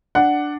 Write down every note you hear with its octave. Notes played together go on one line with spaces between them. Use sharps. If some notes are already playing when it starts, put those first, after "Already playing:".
D4 F#5